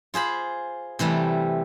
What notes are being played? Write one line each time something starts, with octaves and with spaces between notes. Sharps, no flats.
F4 G#4 C5 B5
C3 E3 G3 A3